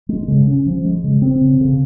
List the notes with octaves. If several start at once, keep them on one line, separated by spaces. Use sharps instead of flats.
G#3
C#3
C#4
F3
G#3
C#3
C4
C#3
C#3